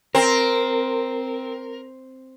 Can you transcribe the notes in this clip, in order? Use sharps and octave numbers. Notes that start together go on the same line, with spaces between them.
C4 A#4